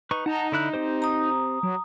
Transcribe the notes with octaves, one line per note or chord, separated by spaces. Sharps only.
D#4 B4 C#6
D#4 F#5 A5 A#5
D3 E4 F#6
C4 G4 C5
A#5 D#6
F#3